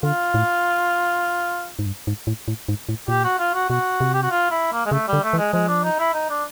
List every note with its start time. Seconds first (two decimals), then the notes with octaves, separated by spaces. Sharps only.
0.03 D3 F4
0.34 A2
1.79 G#2
1.86 G2
2.07 G#2
2.27 A2
2.48 A2
2.68 G#2
2.89 A2
3.08 A#2 G4
3.24 F#4
3.39 F4
3.54 F#4
3.69 B2 F#4
4.00 C3
4.13 G4
4.23 F#4
4.30 F4
4.51 E4
4.72 A#3
4.86 G#3
4.91 C#3 A3
5.08 G3
5.13 D3
5.23 A3
5.33 E3
5.38 G#3
5.53 F3 G#3
5.68 D4
5.83 D#4
5.99 E4
6.14 D#4
6.30 D4